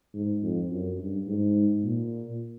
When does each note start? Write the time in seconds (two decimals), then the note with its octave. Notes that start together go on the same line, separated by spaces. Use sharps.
0.14 G#2
0.42 F2
0.71 F#2
0.99 G2
1.27 G#2
1.84 A#2